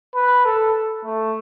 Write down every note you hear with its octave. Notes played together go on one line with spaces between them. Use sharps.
B4
A4
A3